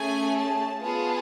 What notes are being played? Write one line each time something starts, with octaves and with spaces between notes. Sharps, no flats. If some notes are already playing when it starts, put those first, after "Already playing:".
Already playing: A3 C#4 G#4 G#5
A5
B3 F4 G#4 A5